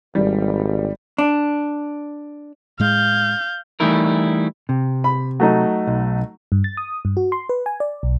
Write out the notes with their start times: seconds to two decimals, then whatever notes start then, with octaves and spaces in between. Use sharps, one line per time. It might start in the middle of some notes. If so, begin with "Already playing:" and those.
0.15 G#1 G3
1.18 D4
2.80 A2 G#3 F5 G6
3.80 E3 G3 A3 D#4 E4 A#4
4.69 C3
5.04 B5
5.40 F#3 A3 D#4
5.87 B1
6.52 G2
6.64 A6
6.77 D#6
7.05 G2
7.17 F#4
7.32 C6
7.49 B4
7.66 G#5
7.80 D5
8.03 B1